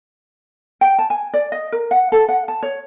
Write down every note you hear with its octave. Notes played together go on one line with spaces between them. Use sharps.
G5
A5
G#5
D5
D#5
A#4
F#5
A4
F#5
A5
C#5